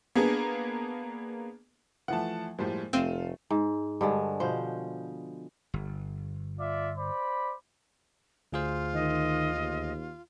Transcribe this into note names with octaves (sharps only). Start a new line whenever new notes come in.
A#3 B3 D4 G#4
E3 F3 A3 F#5 A5
A2 F3 G3 G#3 A#3 C5
F1 A3 C4 F4 D#7 E7
G#2
G2 D3 G#3
B2 F3 C5
G1
F4 D5 E5
C5 D5 B5
D2 F4 G#4 C5
D#3 D#5
D#2